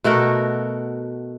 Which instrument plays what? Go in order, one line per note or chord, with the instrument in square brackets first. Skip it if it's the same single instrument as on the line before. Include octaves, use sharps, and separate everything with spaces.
[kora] B2 A3 F#4 A#4